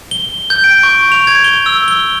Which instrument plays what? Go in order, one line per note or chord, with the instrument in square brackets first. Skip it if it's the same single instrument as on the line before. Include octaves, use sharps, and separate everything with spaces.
[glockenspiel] G7
G6
D7
C#6
F7
G#6
G7
E6
G7